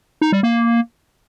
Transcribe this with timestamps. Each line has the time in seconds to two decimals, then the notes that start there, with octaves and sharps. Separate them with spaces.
0.22 D#4
0.32 G3
0.43 A#3